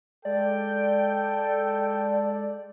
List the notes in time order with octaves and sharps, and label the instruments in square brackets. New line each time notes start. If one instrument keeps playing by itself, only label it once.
[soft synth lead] G#3 [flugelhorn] A4 [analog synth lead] D5 [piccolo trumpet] G5